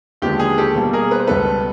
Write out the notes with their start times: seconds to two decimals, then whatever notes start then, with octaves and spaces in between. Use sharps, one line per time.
0.22 D#2 D3 F3 G#3 B3 G4
0.39 G#4
0.58 G4 A4
0.75 B2 G3 A#3
0.93 G#4 A#4
1.11 B4
1.20 C5
1.27 C#2 B2 G3 B3 A4 B4